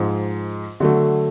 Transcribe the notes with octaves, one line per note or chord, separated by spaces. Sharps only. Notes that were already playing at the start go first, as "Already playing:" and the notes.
Already playing: G#2 F3 G#3
D3 F#3 A3